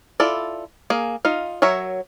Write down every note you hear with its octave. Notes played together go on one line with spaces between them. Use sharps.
E4 F4 A4 D5
A#3 G#4
D#4 F4 F5
F#3 A#4 C#5 E5